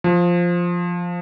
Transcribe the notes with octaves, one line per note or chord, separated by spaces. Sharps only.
F3